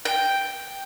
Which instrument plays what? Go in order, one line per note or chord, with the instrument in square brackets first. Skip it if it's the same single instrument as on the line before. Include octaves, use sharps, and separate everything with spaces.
[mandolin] G5